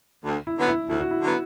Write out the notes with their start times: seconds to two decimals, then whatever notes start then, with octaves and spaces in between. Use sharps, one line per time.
0.25 D2
0.47 E4
0.58 D3 F#3 B3
0.68 E4
0.90 D2 E4
1.00 F#4
1.11 E4
1.22 D3 F#3 B3